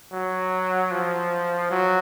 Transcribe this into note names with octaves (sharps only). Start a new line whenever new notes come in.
F#3
F3
F#3